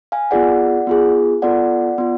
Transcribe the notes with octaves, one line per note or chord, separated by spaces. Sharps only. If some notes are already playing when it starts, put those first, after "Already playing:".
F5 G#5
B3 F4 G#4 D5 F#5
B3 F4 G#4
B3 F4 A4 D5 F#5
B3 F4